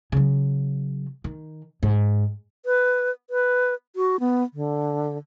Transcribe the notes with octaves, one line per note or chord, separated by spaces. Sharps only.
C#3 F#3
D#3
G#2
B4
B4
F#4
B3
D3